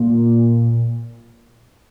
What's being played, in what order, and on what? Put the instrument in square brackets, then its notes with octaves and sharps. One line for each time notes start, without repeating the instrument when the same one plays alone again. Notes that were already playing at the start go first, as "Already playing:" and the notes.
Already playing: [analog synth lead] A#2